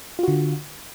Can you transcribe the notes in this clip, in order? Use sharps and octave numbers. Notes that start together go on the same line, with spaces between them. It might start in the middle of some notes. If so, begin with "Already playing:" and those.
D3 F4 F#4